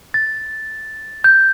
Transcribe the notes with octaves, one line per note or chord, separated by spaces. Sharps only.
A6
G6